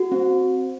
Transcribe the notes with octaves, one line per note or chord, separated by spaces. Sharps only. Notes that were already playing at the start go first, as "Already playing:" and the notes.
Already playing: F#4
C4